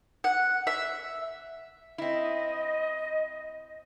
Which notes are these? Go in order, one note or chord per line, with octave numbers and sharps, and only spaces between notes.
F#5
E5
C4 E4 D#5